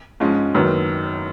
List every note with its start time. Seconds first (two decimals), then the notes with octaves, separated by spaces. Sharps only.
0.20 G#2 F3 G#3 C#4
0.55 F#1 F#2 D#3 F#3 B3